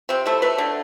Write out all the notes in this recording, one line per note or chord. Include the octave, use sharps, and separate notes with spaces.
C3 C4
A3 E4
A3 B4
D3